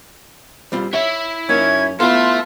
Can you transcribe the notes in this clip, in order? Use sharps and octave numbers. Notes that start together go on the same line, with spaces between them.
G3 C4 F4
E4 C#5 E5
F#2 A#3 C#4 D#4 G#6
B3 E4 F4 A4 E5 C6